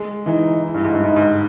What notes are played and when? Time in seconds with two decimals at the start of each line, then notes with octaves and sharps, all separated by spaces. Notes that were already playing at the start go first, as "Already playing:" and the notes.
Already playing: G#3
0.26 E3 D#4
0.66 E4
0.75 G2
0.85 G#2
0.94 G2
1.04 G#2 D#4
1.16 G#2